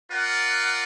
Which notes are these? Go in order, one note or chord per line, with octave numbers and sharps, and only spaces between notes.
F4 A#4 D5 F#5